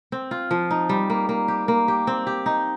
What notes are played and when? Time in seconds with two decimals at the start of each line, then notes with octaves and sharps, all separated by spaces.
0.12 C4
0.31 F4
0.51 F3
0.71 D#4
0.89 G3
1.10 A#3
1.29 A#3
1.48 G4
1.68 A#3
1.88 G4
2.07 C4
2.27 G4
2.46 D#4